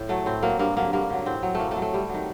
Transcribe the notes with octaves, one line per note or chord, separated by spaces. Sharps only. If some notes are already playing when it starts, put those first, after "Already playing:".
Already playing: A2
F#3 A3
A2 C4
F#3 A#3
G2 A#3
D3 F#3 A#3
G2 A#3
D3 F#3
A2 C4
F#3
A2 A3 A#3
A3
F#3
A3
C3 G3
D#3 F#3